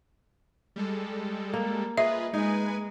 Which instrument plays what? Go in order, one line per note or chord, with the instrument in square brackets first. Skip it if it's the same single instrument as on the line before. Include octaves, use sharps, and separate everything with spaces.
[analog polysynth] G3 G#3 A4
[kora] A#3
[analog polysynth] F4 G#4 B4 [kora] D#5 [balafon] E5
[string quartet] G#3 [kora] D#4 [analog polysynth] B4 G#5